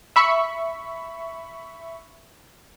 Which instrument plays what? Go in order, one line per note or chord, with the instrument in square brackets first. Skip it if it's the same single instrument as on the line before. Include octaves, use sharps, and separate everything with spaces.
[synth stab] E5 B5 C#6